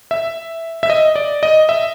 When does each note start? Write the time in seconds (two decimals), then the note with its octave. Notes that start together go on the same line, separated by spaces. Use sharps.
0.11 E5
0.83 E5
0.90 D#5
1.16 D5
1.43 D#5
1.69 E5